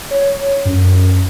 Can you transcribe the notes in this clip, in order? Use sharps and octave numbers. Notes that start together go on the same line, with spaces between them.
C#5
F#2